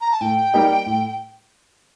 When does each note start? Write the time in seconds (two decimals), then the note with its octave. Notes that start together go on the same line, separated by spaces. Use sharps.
0.01 A#5
0.11 A5
0.21 A2 G5
0.54 G3 A#3 D#4 G4
0.86 A2